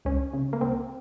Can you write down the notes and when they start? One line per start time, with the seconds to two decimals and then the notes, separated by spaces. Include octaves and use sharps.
0.05 C#2 C#4
0.33 C#3
0.53 A#3
0.61 C#2 C4